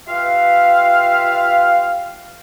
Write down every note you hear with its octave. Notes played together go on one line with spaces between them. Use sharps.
F4 G4 B4 E5 F5